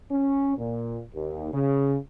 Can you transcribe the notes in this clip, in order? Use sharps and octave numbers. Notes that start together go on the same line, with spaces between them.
C#4
A#2
D#2
C#3